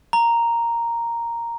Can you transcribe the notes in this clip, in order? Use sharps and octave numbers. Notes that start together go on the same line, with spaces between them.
A#5